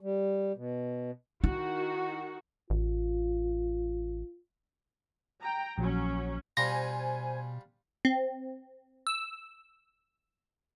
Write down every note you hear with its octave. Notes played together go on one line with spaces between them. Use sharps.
G3
B2
D#3 E4 F#4
A1 F4
G5 A#5
A#1 F#3 C#4
B2 G3 D4 F4 C5 G#5 A#6
C4
E6